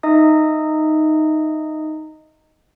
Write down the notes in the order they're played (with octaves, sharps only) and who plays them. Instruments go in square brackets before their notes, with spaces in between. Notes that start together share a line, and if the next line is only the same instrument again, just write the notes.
[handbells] D#4 D#5 E5 D#6